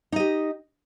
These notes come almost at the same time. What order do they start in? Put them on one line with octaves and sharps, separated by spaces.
D#4 D#5 G4